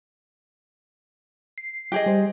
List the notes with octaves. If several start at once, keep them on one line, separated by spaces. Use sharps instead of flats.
C7
G4 G#4 D#5
G3 C5